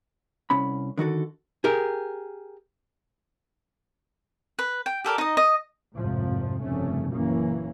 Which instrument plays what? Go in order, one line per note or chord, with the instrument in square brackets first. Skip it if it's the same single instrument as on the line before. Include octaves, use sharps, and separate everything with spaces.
[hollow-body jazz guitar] C2 C#4 B5
D3 D#3 F#4 A4
G4 G#4 A#4
[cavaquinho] B4
G5
G4 A4 A#4 D5
D#4 D#5
D#5
[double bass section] G#1 F2 A2 C3 F3
F1 G2 C#3 A3 C#4
F#1 A#2 E3 A#3 C#4